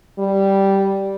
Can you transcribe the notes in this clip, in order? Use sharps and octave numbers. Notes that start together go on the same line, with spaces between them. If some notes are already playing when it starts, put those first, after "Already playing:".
G3